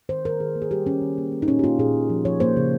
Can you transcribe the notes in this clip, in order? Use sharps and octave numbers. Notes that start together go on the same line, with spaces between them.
D#3 C5
D#3 A#4
D#3 G#4
A#3
G#4
G3 G4
D#3 C#4
D#3
A#3
A#3
D#4
A#2 C#4
G4
A#3 F4
A#2 G#4
A#2
F3
F3 C#5
A#3 C5
C#3